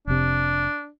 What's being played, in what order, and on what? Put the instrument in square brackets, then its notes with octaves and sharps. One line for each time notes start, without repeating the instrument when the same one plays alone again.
[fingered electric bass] F1 C3 [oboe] D4